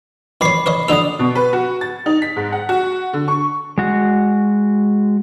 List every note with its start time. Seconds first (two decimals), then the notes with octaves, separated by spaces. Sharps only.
0.41 D#3 C#5 B5 D6 C7
0.66 A#4 C#5 D#5
0.88 D3 D#4 A4 D#6 F7
1.19 B2
1.35 B4
1.53 F#4
1.81 A6
2.06 D#4
2.22 B6
2.36 G#2
2.52 F#5
2.69 F#4
3.13 D3
3.28 C#6
3.78 G#3 F#4